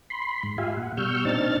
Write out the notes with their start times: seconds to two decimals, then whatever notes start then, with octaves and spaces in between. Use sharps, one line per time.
0.10 B5 C6
0.43 G#2
0.58 F4 G4 E5 F5 G#5
0.77 A#2 F#5
0.97 B2 G3 C#6 E6 F6 G6
1.25 A#2 C4 D4 D#4 F6 A6